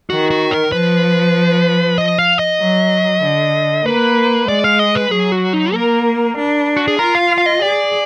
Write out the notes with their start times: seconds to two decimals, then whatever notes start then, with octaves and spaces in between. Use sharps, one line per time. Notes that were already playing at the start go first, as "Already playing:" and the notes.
0.10 D#3 F#4
0.30 F#4
0.51 A#4
0.72 F3 B4
1.98 D#5
2.18 F5
2.39 D#5
2.60 F#3
3.23 D3
3.85 A#3 B4
4.48 G#3 D5
4.64 F5
4.79 D#5
4.95 B4
5.11 F#3 G#4
5.32 F#4
5.53 D#4
5.73 A#3 A#4
6.37 D4
6.76 F#4
6.88 G#4
6.99 F4 A#4
7.15 F5
7.38 F5
7.46 D#5
7.62 G#4 D5